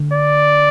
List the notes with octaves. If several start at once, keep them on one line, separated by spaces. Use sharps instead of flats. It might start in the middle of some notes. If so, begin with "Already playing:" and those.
Already playing: D3
D5